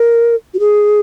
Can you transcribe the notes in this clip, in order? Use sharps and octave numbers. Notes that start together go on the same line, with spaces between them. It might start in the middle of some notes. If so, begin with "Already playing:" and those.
Already playing: A#4
F#4
G#4